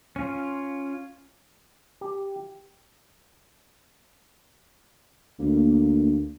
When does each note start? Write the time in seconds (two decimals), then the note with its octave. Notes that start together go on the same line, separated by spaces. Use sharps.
0.16 C#4 F4
2.01 G4
5.39 D2 A#3